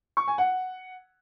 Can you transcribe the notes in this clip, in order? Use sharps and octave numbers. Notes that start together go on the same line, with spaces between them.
C#6
G#5
F#5